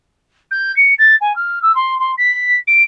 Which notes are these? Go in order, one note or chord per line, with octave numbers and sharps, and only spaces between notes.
G6
C#7
A6
G#5
F6
E6
C6
C6
B6
D7